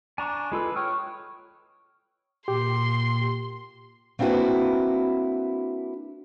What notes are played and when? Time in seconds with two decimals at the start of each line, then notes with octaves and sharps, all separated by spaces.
0.18 D4 G#5 A#5 C#6
0.52 G#3 F4 A4 B4
0.76 C#5 G5 D#6 F6
2.48 A#2 G4 C6
4.19 A#3 C4 D4 E4 F#4 B4